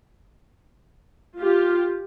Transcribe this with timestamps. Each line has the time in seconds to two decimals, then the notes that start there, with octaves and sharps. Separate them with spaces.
1.38 F4 G4